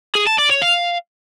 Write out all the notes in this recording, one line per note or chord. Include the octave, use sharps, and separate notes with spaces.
G#4
A5
D5
C#5
F5